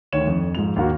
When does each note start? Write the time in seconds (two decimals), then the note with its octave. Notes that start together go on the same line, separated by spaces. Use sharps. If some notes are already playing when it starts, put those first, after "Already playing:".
0.13 D2 D#3 C#5 E7
0.27 F2
0.55 G#2 F3 F7
0.76 D#2 A#3 F#4